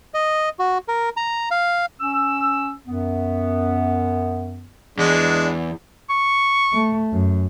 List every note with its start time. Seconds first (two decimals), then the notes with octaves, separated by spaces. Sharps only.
0.14 D#5
0.59 F#4
0.88 A#4
1.17 A#5
1.51 F5
2.00 C#4 E6
2.86 F#2 B3
4.98 E2 G#3 D4
6.10 C#6
6.73 A3
7.12 F#2